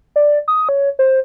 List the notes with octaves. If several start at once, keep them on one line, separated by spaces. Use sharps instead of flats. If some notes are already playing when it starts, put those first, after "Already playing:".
D5
D#6
C#5
C5